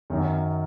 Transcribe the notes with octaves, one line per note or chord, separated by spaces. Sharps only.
F#2 D#3 F#3 C#4